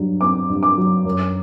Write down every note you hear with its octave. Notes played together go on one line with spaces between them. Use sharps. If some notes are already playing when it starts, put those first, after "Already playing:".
Already playing: G2 F#3
C4 D6
G2
D6
F#3
F#2